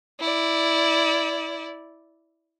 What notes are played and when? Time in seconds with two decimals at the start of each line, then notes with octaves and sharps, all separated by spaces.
0.20 E4 D5